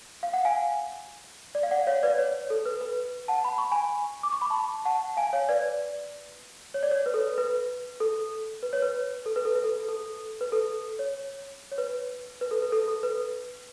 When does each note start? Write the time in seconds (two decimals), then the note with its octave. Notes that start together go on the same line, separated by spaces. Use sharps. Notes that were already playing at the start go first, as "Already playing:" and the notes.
0.23 F5
0.33 F#5
0.45 F5 G#5
1.55 D5
1.63 F5
1.71 D5 F#5
1.87 C#5 F5
2.03 B4 D5
2.18 C#5
2.50 A4
2.65 B4
2.81 B4
3.28 F#5 A5
3.44 B5
3.58 C#6
3.72 G#5 B5
4.23 D6
4.33 C#6
4.41 B5
4.50 A5 C#6
4.85 F#5 A5
5.17 F5 G#5
5.33 C#5 F5
5.49 B4 D5
6.74 C#5
6.83 D5
6.91 C#5
7.06 B4
7.14 A4
7.21 B4
7.38 B4
8.00 A4
8.63 B4
8.73 C#5
8.82 B4
9.26 A4
9.36 B4
9.45 A4
9.55 B4
9.64 A4
9.89 A4
10.41 B4
10.52 A4
10.99 C#5
11.72 C#5
11.78 B4
12.41 B4
12.51 A4
12.62 B4
12.72 A4
12.88 A4
13.03 B4